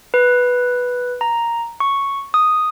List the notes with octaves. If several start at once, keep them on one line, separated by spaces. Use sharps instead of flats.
B4
A#5
C#6
D#6